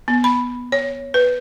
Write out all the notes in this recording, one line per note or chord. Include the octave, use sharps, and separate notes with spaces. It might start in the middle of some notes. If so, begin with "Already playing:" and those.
B3
B5
C#5
B4